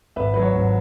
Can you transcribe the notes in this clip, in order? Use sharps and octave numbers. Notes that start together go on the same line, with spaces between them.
G#1 B4 E5
F#3 B4
C#5
G#1